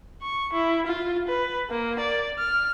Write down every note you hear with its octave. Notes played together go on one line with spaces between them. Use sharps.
C#6
E4
F4
B4
A#3
D5
F6